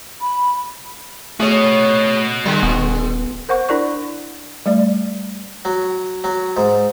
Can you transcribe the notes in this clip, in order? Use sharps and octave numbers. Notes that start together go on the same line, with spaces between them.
B5
A3 F#4 G#4 C#5 D#5
D3 G3 G#3
D#1 B3
A#4 C5 F#5 C#6
D4 E4 A#4 D5 C#6
G3 A3 D5
F#3
F#3
G#2